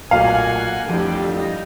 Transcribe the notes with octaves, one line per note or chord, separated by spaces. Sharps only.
B1 A#2 A3 A#3 F5 F#5 G#5
F2 A2 D3 G3 G4
G3 D#4